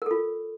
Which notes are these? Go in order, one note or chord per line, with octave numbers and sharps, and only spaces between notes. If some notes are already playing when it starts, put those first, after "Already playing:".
F4 A4 A#4